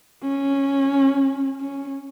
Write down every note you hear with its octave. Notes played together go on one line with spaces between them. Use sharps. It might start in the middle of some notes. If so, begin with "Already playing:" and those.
C#4
C#4